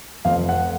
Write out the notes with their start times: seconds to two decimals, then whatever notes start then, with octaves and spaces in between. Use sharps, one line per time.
0.25 F1 F2 F3 F5
0.49 F#5